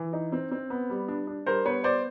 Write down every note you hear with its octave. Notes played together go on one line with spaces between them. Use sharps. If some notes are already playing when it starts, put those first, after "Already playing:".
Already playing: E3
D#4
C4
C4
B3
G3
D4
D4
G3 A#4 C5
B3 B4 C#5
B3 C5 D5